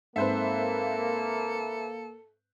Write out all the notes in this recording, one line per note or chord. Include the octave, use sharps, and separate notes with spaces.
G#2 A#3 C4 A4 B4 C5 E5